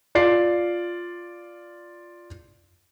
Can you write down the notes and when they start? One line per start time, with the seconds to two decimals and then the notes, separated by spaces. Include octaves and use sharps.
0.15 F4 D5 C7